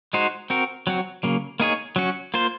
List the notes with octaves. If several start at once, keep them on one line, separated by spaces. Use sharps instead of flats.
G#3 D#4 F#4 C5
C4 F#4 A#4
F#3 C4 F#4
C#3 F#3 A#3
A#3 D#4 G#4 C#5
F#3 C#4 F#4
A#3 F4 C5